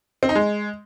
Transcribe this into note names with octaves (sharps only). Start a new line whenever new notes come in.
C4
D#4
G#3